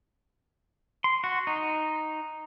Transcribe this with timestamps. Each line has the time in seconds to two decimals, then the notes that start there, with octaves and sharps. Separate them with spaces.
1.04 C6
1.24 F#4
1.47 D#4